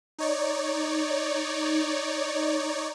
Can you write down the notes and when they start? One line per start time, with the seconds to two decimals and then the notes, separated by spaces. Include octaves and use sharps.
0.18 D#4 C#5 D5